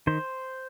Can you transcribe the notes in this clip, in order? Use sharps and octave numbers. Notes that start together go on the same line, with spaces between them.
D#3 C5